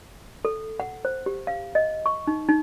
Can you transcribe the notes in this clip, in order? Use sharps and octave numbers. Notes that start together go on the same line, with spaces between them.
A4
F#5
C5
G4
F5
D#5
C#6
D#4
D#4